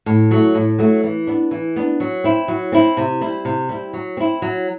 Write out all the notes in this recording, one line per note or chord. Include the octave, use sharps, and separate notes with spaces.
A2
F#3 A3
A2
F#3 A3
E3
B3 D4
E3
B3 D4
F#3
C4 E4
F#3
C4 E4
C3
G3 C4 E4
C3
G3 C4 E4
F#3
C4 E4
F#3